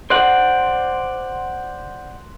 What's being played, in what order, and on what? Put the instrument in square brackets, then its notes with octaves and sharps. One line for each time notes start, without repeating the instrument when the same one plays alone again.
[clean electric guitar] C5 D5 F#5 [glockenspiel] C6 F#6 F#7